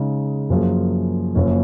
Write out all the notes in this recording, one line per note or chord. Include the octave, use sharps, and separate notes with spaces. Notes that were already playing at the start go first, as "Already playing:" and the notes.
Already playing: C#3 G#3 D#4
F#2 F3 A#3 F4 G#4
F#1 F#2 F3 A#3 C#4